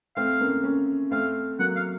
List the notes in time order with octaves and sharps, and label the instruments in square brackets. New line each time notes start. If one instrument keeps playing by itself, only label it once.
[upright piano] A3 C4 [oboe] F5
[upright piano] A#3 C#4
A#3 C#4
[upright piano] A3 C4 [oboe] F5
[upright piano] F#3 A#3 [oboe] F#5
[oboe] F5